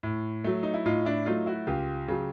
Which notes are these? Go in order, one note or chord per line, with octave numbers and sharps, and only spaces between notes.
A2
F#3 A3
D#4
E4
A2 D#4 F4
D4 E4
F#3 A3 D#4 F4
E4 F#4
C#2 F4 G4
C#3 F#3